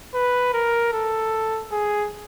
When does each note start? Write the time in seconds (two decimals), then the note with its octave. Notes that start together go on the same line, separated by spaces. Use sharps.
0.14 B4
0.54 A#4
0.93 A4
1.72 G#4